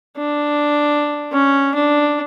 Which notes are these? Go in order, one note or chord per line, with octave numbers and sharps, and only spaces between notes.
D4
C#4
D4